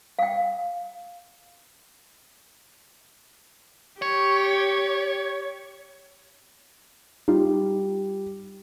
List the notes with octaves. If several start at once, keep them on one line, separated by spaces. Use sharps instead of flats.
F5 G5
G4 C#5
G3 D#4 F4